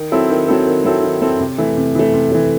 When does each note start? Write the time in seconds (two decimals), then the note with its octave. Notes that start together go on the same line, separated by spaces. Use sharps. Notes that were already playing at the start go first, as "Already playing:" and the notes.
Already playing: D#3
0.12 F#3 C4 E4 A4
0.30 D#3
0.48 F#3 C4 E4 A4
0.67 D#3
0.85 F#3 C4 E4 A4
1.03 D#3
1.22 F#3 C4 E4 A4
1.40 C3
1.58 E3 A3
1.77 C3
1.95 E3 A3
2.14 C3
2.32 E3 A3